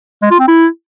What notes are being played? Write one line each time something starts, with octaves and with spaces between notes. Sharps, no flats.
G#3
F4
C4
E4